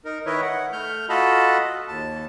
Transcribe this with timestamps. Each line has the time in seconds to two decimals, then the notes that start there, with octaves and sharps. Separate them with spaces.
0.05 D#4 A#4
0.26 D#3 E4 A#4 B4 C#5 D#5
0.42 F#5
0.73 A3 F6 G6
1.09 F4 F#4 A4 D#5 A5 B5
1.88 D#2 A5